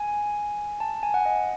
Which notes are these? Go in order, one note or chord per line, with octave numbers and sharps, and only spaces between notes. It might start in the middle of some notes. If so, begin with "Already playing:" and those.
Already playing: G#5
A5
G#5
F#5
D#5